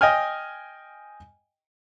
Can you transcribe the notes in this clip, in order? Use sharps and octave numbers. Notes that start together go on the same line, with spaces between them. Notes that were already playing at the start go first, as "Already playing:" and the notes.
D#5 G5 G#5 F6